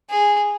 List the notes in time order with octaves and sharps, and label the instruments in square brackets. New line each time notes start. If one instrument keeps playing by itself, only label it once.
[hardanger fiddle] G#4